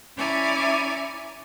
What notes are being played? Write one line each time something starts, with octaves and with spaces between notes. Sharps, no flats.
C#4 E4 C#5 D5 G#5 A#5